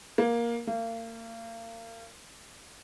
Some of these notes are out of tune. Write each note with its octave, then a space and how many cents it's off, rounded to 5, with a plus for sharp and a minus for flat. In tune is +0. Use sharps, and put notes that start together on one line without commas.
A#3 +10
A#3 -35